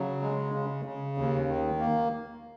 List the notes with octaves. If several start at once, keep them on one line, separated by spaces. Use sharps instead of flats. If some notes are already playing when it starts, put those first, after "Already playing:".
Already playing: C#3 F#3
G#3
C#3
C#3
D#2
D#3
A#3